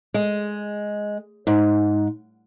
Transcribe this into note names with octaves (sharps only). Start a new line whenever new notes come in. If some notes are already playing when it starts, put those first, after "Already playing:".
G#3
G#2